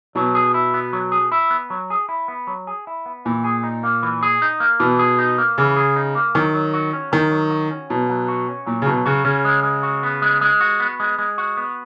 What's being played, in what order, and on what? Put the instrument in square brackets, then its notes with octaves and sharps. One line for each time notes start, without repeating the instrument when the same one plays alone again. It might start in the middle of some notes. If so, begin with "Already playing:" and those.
[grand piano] B2 [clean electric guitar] F#3
[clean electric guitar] G#4
E4
B3
F#3
G#4
E4
B3
F#3
G#4
E4
B3
F#3
G#4
E4
B3
[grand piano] A#2 [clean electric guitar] E3
[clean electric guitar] G#4
D#4
A#3
E3
G#4
D#4
A#3
[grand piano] B2 [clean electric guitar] E3
[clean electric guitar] G#4
D#4
A#3
[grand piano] C#3 [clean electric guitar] E3
[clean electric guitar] G#4
D#4
A#3
[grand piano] D#3 [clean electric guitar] F#3
[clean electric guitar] F#3
F#4
C#4
[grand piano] D#3 [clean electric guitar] F#3
[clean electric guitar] F#3
F#4
C#4
[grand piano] B2 [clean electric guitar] F#3
[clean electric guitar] F#3
F#4
C#4
[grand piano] A#2 [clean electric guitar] F#3
[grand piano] C#3
[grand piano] B2 [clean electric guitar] F#3
[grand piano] C#3 [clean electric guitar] F#4
[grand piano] C#3 [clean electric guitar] C#4
[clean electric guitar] G#3
G#3
F#4
B3
G#3
G#3
F#4
B3
G#3
G#3
F#4
B3